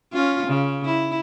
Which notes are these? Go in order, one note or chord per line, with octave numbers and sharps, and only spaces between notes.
C#4 F4
C#3
E4